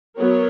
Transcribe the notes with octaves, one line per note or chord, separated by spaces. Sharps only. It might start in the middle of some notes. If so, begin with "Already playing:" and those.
F#3 B3 A#4 C#5